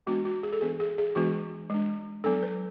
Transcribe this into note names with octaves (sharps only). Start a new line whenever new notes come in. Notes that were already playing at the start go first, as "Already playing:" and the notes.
E3 G#3 B3 D4 F#4
F#4
G#4
A4
E3 B3 D4 G#4
G#4
G#4
E3 G#3 B3 D4 F#4
G#3 D4
F#3 B3 D4 A4
B4